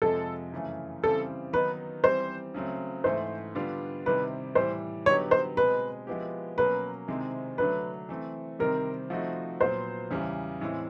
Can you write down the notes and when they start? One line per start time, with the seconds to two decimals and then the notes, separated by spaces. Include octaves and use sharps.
0.02 F2 C3 F3 G#3 A4
0.52 F#2 C#3 E3 A3
1.03 C#3 E3 G3 C4 A4
1.53 D#3 F#3 B3 D#4 B4
2.04 E3 G3 C4 C5
2.54 C#3 F#3 A3 C4
3.04 G#2 E3 A3 C5
3.55 D3 G3 B3 D4 F4
4.06 C3 D#3 G3 C4 E4 B4
4.55 A2 E3 G3 C5
5.06 D3 F#3 B3 D#4 G4 C#5
5.31 C5
5.56 B2 G#3 C4 B4
6.07 F3 G#3 B3 E4 G4
6.58 B2 F#3 A#3 C#4 B4
7.08 C3 D#3 G#3 C4 E4
7.58 D3 F#3 A3 D4 B4
8.09 E3 A3 C4
8.59 C3 D#3 G3 C4 A#4
9.10 F3 A3 C4 D#4 F#4
9.60 A#2 F#3 B3 C5
10.11 E2 C#3 E3 G3
10.61 A2 E3 G#3 C4 E4